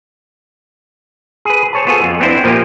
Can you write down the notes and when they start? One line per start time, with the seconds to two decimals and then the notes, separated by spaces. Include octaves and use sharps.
1.45 G#4 B4
1.73 C5 C#5 A5
1.87 B3 F4 G#4 A4
2.03 F2
2.20 B3 C4 D4 E4 C5
2.44 A#2 F3 A#3 F4 G4